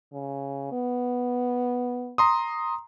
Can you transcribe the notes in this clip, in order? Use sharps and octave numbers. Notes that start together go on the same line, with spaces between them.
C#3
B3
A#5 C6 D#6